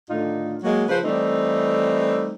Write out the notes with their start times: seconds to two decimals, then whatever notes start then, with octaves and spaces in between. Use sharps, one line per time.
0.10 A2 D3 D#3 D#4 F4
0.63 F#3 G#3 A#3
0.89 C#3 F3 B4 C5
1.04 E3 G3 A3 C4 D#4